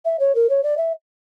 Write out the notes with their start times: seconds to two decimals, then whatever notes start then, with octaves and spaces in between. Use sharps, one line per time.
0.05 E5
0.19 C#5
0.35 A#4
0.49 C#5
0.63 D5
0.77 E5